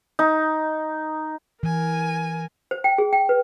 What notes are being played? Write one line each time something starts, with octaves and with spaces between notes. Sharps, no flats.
D#4
E3 A#4 G#5
C5
G5
G#4
G5
B4